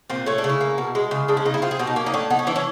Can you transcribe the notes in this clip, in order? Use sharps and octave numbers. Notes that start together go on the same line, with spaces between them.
A#2 C4
A3 C#4
D4
C#3
E4
A#3
B2
G#3
C#3
G#3 D4
C#4
C#3 D#4
E4
C4 F4
G#4
B2 G4
D#4
A#3 C#4
D#4
A2 D4
B3 D#4
C#4
E3 D4
C#4